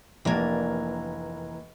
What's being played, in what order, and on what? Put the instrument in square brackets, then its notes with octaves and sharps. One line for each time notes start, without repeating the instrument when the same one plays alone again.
[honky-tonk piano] F1 [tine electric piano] E3 A#5 G#6 [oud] A#3 D4